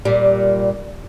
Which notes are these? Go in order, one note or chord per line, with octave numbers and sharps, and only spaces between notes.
A#2 G3